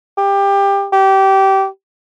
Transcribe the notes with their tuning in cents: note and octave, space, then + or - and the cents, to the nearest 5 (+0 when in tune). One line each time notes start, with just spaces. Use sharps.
G4 +20
G4 -20